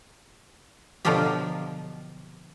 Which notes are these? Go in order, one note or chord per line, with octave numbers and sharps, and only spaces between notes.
B2 D3 F3 F#3 F4 G4